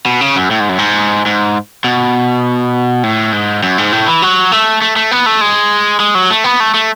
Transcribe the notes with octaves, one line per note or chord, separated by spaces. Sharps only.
B2
C#3
F#2
A2
G#2
F#2
G#2
G#2
B2
A2
G#2
F#2
G#2
A2
E3
F#3
A3
A3
A3
B3
A3
G#3
G#3
F#3
A3
B3
A3
A3